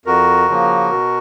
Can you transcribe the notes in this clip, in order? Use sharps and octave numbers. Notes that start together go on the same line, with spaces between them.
F2 F#4 A#4
C#3 F3 A#3
B2